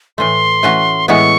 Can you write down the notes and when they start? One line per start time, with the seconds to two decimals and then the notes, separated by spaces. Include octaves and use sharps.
0.18 A2 E3 A3 C6
0.63 E3 A3 C#4 F#4 B4
1.08 A2 E3 G#3 B3 E4 C#6